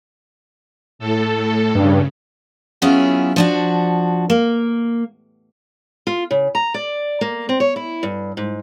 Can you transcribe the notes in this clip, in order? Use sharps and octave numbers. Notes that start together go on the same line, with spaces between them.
A2 A4
G2 C#3
F#3 B3 C#4 E4 F4 G#4
F3 D4 F#4
A#3
F4
C#3
A#5
D5
A#3
C4
C#5
E4
G2
G#2